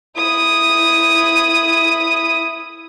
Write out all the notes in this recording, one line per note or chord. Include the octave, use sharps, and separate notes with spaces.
E4 D#6